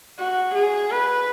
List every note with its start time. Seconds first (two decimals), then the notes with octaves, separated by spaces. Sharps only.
0.18 F#4
0.54 G#4
0.90 B4